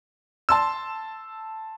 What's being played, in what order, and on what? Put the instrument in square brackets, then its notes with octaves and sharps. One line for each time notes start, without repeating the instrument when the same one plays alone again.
[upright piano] A5 C6 E6